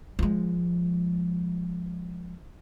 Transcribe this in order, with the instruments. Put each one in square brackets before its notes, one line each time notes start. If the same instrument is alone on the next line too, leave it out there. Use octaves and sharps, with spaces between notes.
[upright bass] F3 G#3